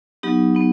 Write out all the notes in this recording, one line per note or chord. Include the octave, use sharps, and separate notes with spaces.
F#3 B3 D#4 G4
B3 D#4